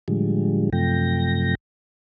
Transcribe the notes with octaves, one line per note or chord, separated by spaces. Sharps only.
A2 D3 F3 G3 G#3
F#2 C3 F3 A3 G5 A#6